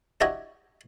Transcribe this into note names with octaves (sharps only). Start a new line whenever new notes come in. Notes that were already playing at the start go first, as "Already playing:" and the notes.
D4 E4 F#4 G4 C#5 D#5